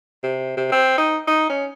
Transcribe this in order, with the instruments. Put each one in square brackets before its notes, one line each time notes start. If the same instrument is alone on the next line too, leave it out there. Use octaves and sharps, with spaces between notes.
[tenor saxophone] C3
C3
C4
D#4
D#4
C#4